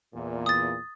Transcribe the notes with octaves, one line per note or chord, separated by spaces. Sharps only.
E2 A#2
D#6 A6